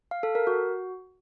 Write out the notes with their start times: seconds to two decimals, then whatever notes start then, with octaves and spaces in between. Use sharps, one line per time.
0.11 F5
0.23 A4
0.35 A#4
0.47 F#4